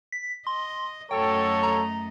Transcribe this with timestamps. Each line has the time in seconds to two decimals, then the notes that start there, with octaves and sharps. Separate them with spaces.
0.12 B6
0.47 D#5 C6
1.11 F#2 F#3 A3 A4 C#5 D#5 G5
1.63 A#5